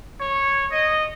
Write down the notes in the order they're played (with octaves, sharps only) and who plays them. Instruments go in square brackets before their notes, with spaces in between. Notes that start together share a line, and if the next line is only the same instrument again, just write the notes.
[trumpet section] C#5
D#5